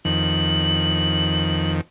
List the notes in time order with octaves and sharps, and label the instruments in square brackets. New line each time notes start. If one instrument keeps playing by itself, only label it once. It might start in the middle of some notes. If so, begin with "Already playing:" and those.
[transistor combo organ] F2 D#3 [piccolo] F#7